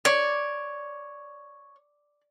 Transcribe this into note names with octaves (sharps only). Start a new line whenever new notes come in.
C#5 D5